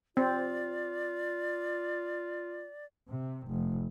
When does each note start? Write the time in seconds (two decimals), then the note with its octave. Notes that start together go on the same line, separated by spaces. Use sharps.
0.17 C4 F4 D5
3.10 C3
3.48 F1